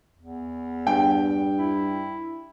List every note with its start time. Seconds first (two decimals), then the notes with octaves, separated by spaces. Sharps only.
0.18 E2
0.87 G2 G5
1.58 E4